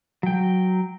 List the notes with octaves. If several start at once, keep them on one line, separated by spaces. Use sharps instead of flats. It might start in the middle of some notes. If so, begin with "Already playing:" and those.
F#3 G5